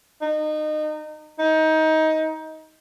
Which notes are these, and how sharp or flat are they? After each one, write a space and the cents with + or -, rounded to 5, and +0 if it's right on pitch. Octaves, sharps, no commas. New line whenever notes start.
D#4 -25
D#4 +20